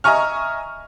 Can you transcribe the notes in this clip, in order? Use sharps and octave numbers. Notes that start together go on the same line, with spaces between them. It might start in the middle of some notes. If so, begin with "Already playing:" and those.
D#5 E5 G#5 A#5 C#6 F6